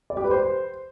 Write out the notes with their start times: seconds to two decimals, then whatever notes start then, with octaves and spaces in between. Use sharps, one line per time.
0.10 D5
0.17 G4
0.24 B4
0.31 C5